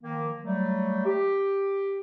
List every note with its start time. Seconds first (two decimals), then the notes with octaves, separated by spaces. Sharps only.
0.03 D#3 F3 A#3
0.43 F#3 G3 A3
1.06 G4